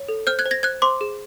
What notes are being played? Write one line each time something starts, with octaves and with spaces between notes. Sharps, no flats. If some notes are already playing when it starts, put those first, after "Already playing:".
Already playing: C#5
A4
C5 F6 G6
F#6 G#6
C5
G#6 A#6
C5 F#6 G#6
C5 C6 D6
G#4